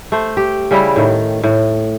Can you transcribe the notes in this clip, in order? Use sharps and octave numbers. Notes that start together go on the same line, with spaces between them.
A3 C5
G4
C#3 G3 E4
A2 D#3
A2